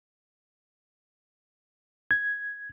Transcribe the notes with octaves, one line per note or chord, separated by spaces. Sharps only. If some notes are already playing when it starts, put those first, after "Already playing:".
G#6